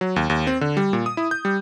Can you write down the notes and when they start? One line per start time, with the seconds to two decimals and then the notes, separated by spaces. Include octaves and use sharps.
0.01 F#3
0.16 D#2
0.30 D#2
0.47 C4
0.61 D3
0.77 G3
0.93 A#2
1.06 D#6
1.17 E4
1.31 G6
1.45 G3